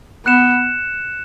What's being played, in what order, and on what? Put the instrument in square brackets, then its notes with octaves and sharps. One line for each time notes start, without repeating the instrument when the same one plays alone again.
[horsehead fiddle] B3 [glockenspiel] F#6 C#7 E7